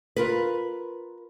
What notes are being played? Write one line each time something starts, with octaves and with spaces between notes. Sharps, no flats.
F4 A#4 B4